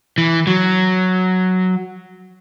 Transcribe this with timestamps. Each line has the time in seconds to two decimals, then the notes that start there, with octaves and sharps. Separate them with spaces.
0.18 E3
0.47 F#3